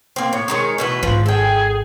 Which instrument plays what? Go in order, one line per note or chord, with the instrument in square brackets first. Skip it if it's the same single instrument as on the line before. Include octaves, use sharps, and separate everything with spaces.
[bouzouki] A#3 C4
[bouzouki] A2 [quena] C#5
[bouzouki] D#3 G#3 D#4
[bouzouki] B2 E3 A3 [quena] B4
[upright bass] G#1 [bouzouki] F3
[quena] G#4 [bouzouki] A4 G5